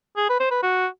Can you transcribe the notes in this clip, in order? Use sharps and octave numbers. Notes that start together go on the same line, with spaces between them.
G#4
B4
C5
B4
F#4